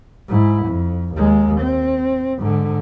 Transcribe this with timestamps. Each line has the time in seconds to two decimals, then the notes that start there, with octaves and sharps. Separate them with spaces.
0.29 G#2 E4
0.65 F2
1.15 D#2 G#3
1.61 C4
2.39 G#2 D3